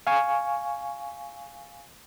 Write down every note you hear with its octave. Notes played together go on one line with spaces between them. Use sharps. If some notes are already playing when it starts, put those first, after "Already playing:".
F5 G#5 C#6